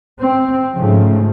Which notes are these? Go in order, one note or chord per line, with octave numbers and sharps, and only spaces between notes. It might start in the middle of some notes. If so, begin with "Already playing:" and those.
C4
G#2 C#3 F3 A3